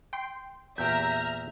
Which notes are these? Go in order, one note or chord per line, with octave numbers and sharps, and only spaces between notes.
G5 C6
E2 A#2 G4 E5 A#5 F6 G6